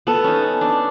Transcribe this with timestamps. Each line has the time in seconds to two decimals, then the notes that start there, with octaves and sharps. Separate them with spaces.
0.07 B3 A4
0.24 C#4 D#4
0.61 D4